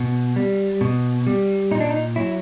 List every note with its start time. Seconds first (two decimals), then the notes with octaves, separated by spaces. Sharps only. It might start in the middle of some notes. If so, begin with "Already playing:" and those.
Already playing: B2
0.36 G3
0.81 B2
1.27 G3
1.71 A#2 D#4
1.80 D4
1.90 D#4
2.16 F#3 E4